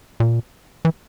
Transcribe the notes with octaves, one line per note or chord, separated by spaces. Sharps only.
A#2
E3